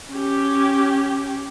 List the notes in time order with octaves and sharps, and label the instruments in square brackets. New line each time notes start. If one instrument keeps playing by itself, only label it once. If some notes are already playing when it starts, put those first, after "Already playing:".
[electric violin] C#4 G4